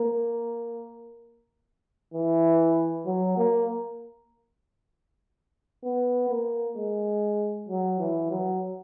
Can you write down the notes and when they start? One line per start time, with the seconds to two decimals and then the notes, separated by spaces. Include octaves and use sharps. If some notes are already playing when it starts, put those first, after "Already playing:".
Already playing: A#3
2.14 E3
3.06 F#3
3.37 A#3
5.84 B3
6.30 A#3
6.77 G#3
7.69 F#3
8.00 E3
8.31 F#3